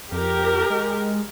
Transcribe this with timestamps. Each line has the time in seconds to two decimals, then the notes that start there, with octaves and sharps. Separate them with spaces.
0.12 F2 G4 A#4
0.70 G#3